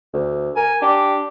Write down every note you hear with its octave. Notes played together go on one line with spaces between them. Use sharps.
D2
A#4 G#5
D4 G4